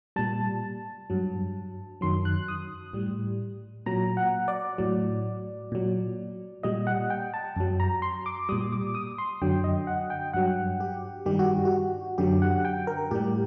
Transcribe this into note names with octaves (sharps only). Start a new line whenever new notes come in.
A#2 G3 A5
G2 F#3
F#2 D#3 F#3 C6
F#6
D#6
A2 G3
A#2 F#3 A#5
F#5
D5
A2 F#3
A#2 F#3
A#2 G3 D#5
F#5
G5
A5
F#2 F#3
A#5
C6
D6
A#2 G3 D#6
D6
D#6
C6
F#2 D3 F#3 G5
D#5
F#5
G5
G2 F#3 F#5
G4
G2 D#3 G3 G4
F#4
F#4
F#2 D3 F#3 G4
F#5
G5
A#4
A2 G3 G4